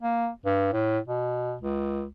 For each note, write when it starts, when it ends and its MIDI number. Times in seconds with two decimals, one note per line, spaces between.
0.01 0.28 58
0.45 0.70 43
0.73 0.99 45
1.08 1.55 47
1.61 2.04 37